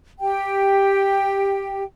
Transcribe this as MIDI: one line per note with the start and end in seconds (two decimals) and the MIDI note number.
0.19 1.83 67
0.19 1.83 79